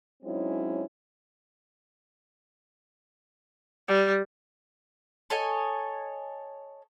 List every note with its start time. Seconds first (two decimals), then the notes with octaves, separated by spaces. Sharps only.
0.23 F#3 G#3 C4 C#4 D#4 E4
3.88 G3
5.30 A4 C#5 D#5 G#5